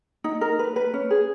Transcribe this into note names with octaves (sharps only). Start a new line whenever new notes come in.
D#4
A#4
B4
B4
C#4
G#4